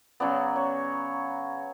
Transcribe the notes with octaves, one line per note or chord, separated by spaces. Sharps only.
C#3 F#3 B3 D5
C#5